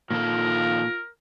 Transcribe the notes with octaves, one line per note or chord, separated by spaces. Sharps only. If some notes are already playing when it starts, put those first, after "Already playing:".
A#2 D#3 F3 A#3 F4 A4 A#4